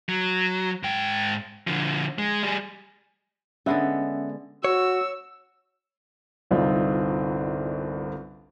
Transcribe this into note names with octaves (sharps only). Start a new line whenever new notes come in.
F#3
G#2 G5
D3 F3
G#3
G3 G#4
D3 G#3 B3 C#4 E5 F#5
F#4 C#5 E6
G1 C2 C4 D#4 F4